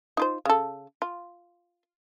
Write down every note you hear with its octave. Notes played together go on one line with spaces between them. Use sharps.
D#4 F4 C5
C#3 A4
F4